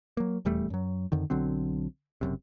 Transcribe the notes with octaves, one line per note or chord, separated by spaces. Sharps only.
F#3 A#3
D#1 E2 G3 A3
F#2 F#3
F2 D3 D#3
B1 D3 F#3 C4
F#1 F#2 C3